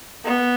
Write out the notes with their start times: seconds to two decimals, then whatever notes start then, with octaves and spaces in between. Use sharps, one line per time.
0.25 B3